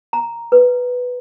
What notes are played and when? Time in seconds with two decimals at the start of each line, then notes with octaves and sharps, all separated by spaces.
0.13 A#5
0.52 B4